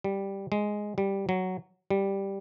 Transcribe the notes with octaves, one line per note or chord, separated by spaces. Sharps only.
G3
G#3
G3
F#3
G3